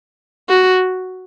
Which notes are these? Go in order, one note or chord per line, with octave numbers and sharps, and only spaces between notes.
F#4